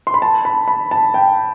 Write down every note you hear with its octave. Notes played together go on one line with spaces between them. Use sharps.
C6
B5
A5
B5
B5
A5
G5